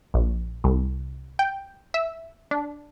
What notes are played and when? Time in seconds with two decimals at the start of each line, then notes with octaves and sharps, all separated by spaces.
0.14 A#1
0.64 C2
1.39 G5
1.94 E5
2.51 D4